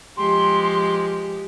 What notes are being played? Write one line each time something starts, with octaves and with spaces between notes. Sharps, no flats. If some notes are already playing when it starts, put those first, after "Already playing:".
F3 G#3 G4 C6